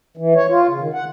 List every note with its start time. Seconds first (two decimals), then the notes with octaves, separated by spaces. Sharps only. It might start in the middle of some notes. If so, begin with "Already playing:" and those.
0.17 E3
0.35 C#5
0.50 F4
0.68 C#3
0.80 D#3
0.93 F#5